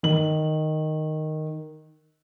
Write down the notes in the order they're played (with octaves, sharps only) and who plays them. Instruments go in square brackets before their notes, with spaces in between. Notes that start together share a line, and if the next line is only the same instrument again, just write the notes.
[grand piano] D#3 F#7